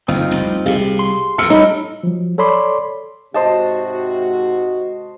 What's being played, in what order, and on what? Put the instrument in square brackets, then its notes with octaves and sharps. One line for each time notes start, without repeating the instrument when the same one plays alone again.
[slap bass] F#1 D2 [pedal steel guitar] C4 D#4 F4
[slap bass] F1 C2
[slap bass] C2 A#2 [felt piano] G4 G#4 F5
[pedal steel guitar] C6
[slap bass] E2 G#2 [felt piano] E6 F6 C#7
[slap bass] G3 [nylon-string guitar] D#4 [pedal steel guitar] A4 [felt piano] C#5 B5
[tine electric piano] F3 F#3
A4 C#5 D5 B5 C6 D6
[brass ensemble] G#2 C3 F#4 [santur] C5 D#5 A5